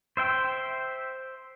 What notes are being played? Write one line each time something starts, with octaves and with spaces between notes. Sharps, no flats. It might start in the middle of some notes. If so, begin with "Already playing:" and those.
C5 E5 G5